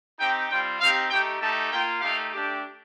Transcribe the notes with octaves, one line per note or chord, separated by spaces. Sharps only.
C4 D#4 G4 G5
G3 C4 F4 G5
C4 D#4 G4 F5
A3 D#4 G4 G5
A3 D#4 G4 A5
A#3 F4 G5
A3 D#4 G4 F5
A3 D4 G4